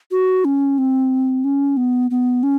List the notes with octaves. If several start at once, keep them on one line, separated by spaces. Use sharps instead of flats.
F#4
C#4
C4
C#4
B3
B3
C#4